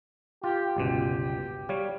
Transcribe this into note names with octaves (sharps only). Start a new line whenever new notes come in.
F4 G4
G1 C#2 B2 G4
G3 C#5 F5